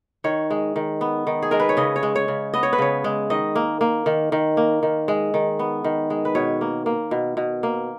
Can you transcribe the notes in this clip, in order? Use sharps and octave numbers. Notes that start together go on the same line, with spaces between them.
D#3 C#5
G#3
D#3
B3
D#3
G#4
G#3 A#4
B4
C#5
C#3 D#5
C#5
G#3
C#5
C#3
B3 D#5
C#5
B4
C#3 C#5
G#3
D#3 D#5
A#3
A#3
D#3
D#3
A#3
D#3
G#3
D#3
B3
D#3
G#3
B4
B2 C#5
A#3
A#3
B2
B2
A#3